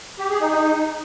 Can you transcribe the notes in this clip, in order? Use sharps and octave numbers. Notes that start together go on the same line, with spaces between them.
G4
G#4
D#4
D#4